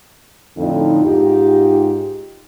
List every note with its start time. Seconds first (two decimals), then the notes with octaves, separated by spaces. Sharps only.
0.57 F2 A2 D3 D#4
1.03 G#2 D#4 F4 G4